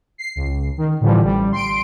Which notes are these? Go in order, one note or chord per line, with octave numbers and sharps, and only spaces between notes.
C7
C#2
D#3
A2 D3 E3 F3 G3
A1 G3
C6 D7